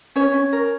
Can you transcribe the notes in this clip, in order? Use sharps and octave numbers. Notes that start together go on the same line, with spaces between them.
C#4 C#5
C#4
A#4